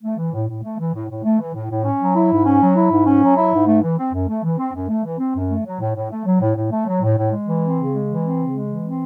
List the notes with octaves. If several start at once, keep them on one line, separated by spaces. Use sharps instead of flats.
A3
E3
A2
A2
A3
E3
A2
A2
A3
E3
A2
A2
C#4
F#3
E4
G#2
C#4
F#3
E4
G#2
C#4
F#3
E4
G#2
A3
E3
C4
F#2
A3
E3
C4
F#2
A3
E3
C4
F#2
A3
F#3
A2
A2
A3
F#3
A2
A2
A3
F#3
A2
A2
G#3
E3
C4
C#3
G#3
E3
C4
C#3
G#3
E3
C4